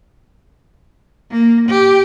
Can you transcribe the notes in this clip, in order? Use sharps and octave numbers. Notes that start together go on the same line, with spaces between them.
A#3
G4